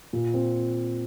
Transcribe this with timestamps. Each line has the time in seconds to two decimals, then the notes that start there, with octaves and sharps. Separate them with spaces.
0.13 A#2
0.34 C4